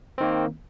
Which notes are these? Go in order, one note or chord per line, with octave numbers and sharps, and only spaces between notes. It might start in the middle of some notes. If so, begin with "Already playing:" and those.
D#3 A#3 C4